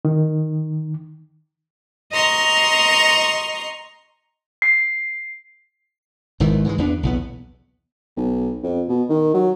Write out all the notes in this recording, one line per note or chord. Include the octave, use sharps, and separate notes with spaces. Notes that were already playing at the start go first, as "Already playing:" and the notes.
D#3
D#5 A#5 C6 C#6
C7
G#1 G#2 D#3 E3
G#2 E3 F3 G#3
E2 B3 D4
B1 E2 B3
B1
F2
B2
D#3
F#3